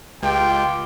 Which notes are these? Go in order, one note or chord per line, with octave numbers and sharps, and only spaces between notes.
C#2 F4 G4 G5